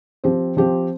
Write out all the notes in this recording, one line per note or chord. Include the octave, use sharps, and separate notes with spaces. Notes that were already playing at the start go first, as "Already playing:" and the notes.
F3 C4 G4 C5
F3 C4 G4 C5